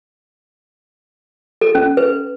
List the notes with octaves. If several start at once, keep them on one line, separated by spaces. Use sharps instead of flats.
A4
C#4
B4